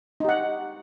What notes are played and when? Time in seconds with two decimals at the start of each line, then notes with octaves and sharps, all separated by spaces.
0.20 D#4
0.25 G4
0.29 F#5